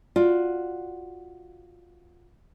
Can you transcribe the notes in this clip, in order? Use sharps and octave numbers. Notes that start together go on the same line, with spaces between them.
F4 F#4 D5